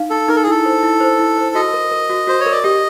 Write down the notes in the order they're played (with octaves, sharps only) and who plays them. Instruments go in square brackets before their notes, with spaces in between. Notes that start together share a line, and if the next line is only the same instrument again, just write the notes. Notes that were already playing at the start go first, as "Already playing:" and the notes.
Already playing: [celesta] D#4 F5
[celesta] D#4 [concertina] A4
[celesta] D#4 [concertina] A#4
[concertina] A4
G#4
[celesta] E4 [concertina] A4
[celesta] C5
E4
C5
E4
C5
[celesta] F#4 [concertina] D#5
[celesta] A#4
A#4
F#4
[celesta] F#4 [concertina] C5
[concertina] C#5
[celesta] A#4
[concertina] D5
[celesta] G4 [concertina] D#5